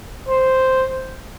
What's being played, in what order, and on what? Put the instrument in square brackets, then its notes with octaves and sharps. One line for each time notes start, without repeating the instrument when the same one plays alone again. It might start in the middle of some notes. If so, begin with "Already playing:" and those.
[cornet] C5